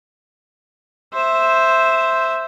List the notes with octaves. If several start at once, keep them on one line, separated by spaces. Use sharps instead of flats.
C5 E5